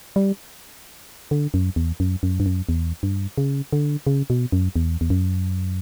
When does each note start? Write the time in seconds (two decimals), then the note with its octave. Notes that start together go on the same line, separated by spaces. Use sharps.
0.16 G3
1.31 D3
1.54 F#2
1.76 E2
2.00 F#2
2.23 F#2
2.40 G2
2.46 F#2
2.69 E2
3.03 G2
3.38 C#3
3.73 D3
4.07 C#3
4.30 B2
4.52 F#2
4.76 E2
5.01 E2
5.10 F#2